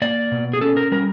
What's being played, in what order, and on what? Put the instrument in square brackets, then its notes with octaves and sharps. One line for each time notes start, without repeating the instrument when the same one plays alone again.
[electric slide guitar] A#3 D5
B2
G#4
C#4 A4
A#4
G3 A#4